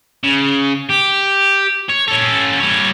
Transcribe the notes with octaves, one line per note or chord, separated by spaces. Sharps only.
C#3
G4
C#5
C#4 A4
G3 C#5